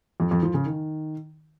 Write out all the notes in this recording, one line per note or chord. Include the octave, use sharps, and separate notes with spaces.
F2
F2
F3
C#3
D#3